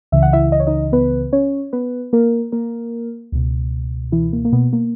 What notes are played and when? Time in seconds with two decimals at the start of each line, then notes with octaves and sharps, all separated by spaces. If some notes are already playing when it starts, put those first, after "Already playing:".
0.12 C#2 C#3 E3 E5
0.23 F#5
0.33 E4 E5
0.52 D#5
0.60 C#5
0.67 D#4 D#5
0.92 B3 B4
1.33 C#4 C#5
1.73 B3 B4
2.13 A#3 A#4
2.52 A#3 A#4
3.32 C#2 B2
4.12 E3 E4
4.33 A#3
4.45 A#3
4.52 B2 B3
4.73 A#3